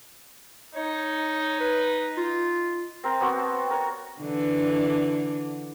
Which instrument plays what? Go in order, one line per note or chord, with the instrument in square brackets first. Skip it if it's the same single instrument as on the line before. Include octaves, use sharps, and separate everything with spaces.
[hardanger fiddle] D#4 [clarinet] C#5
[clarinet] B4
F4
[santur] C4 A#4
B3 C4 F#4
A5
A#4 C#5
[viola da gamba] D3 E3